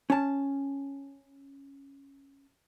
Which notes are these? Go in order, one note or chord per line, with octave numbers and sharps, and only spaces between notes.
C#4 A5